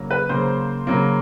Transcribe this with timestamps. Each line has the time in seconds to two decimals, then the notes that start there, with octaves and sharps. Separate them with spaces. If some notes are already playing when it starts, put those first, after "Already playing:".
Already playing: C#3 F#3 A#3
0.10 B4
0.29 C#3 F#3 A#3 C5
0.87 C#3 F#3 A#3